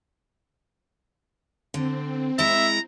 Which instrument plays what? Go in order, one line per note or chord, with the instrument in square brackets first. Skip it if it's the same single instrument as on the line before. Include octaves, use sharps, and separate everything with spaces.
[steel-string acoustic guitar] D3 [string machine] C4
[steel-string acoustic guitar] G#3 E4 [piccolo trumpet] E5 [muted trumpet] A#5